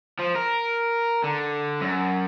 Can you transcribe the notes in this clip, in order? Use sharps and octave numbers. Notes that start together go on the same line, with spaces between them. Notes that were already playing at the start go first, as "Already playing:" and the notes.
F3
A#4
D3
F#2